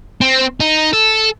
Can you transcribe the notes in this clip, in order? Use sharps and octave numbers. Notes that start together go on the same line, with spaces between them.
C4
D#4
A4